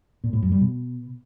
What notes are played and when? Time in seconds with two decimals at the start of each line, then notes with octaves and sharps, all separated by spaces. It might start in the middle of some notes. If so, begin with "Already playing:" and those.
0.24 A#2
0.33 A2
0.42 F#2
0.52 G3
0.61 B2